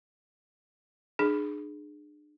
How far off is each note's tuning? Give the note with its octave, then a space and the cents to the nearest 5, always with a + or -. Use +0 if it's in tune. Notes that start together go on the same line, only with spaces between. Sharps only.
D4 +35 G#4 +10